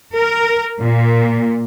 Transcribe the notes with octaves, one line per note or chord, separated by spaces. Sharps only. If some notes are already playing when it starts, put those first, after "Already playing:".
A#4
A#2